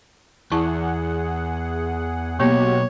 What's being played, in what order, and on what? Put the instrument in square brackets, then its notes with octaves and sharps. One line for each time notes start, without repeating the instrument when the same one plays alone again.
[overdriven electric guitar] E2 [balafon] E4 A5 D6 [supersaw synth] G#4 F#5
[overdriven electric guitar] B1 [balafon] A#3 B3 [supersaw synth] F#4 G4 [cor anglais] C#5